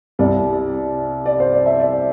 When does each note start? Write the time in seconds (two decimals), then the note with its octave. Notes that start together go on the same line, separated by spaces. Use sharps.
0.19 C2 C3 G3 D5
1.26 D5
1.40 C5
1.53 D5
1.66 E5
1.80 D5